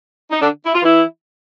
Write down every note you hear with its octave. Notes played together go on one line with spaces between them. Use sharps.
D#4
D3 D4
E4
F4
E3 E4